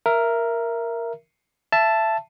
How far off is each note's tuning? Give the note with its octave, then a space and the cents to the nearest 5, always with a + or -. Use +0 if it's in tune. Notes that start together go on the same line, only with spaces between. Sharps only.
A#4 +0 E5 +20
E5 +25 A5 +0